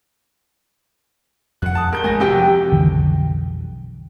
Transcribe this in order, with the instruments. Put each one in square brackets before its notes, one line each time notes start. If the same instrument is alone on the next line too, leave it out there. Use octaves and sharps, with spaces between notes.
[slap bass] F2 [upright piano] F#5 F#6
[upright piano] A5 D#6 F#6
[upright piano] G2 G6 G7 [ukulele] A#4
[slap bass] A1 G#3 A3 [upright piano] G#5 A#6
[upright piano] C3 [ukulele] F#4 G4 G5
[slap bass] F3
[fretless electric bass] B1 F2 D3 E3